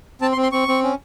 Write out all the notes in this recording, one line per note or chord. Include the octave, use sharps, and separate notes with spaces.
C4 A5
C6
C4
C6
C4 C#6
C4
C#4